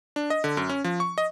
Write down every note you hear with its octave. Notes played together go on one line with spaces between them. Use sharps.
D4
D#5
D3
F#2
C#4
F3
C#6
D#5